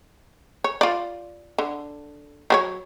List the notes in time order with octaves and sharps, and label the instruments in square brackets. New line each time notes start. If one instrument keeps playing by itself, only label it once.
[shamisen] C#5
F4 D5
D3
F#3 F#4 C#5